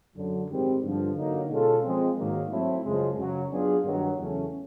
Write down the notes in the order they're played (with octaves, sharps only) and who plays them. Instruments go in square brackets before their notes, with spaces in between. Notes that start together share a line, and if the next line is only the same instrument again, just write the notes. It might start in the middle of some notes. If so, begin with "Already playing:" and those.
[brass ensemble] F#2 D3 F#3
G#2 D#3 G3 C4
G2 D3 F3
D3 F#3 A#3 D#4
B2 G#3 C#4 F4 A4
F3 G#3 C4
G#2 D#3 F#3 A#3
F#3 A3 C4 E4
F#2 C#3 F3 G#3
F#2 C#3 F#3
F#3 B3 D4 F4 G#4
G2 D#3 F#3
E2 C#3 F#3 A3 C#4